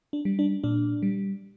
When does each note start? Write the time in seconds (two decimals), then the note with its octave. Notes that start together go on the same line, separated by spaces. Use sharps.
0.13 D4
0.25 G3
0.39 D4
0.64 A#2 D4
1.02 G3